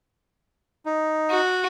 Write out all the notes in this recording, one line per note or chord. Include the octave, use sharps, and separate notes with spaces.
D#4
F#4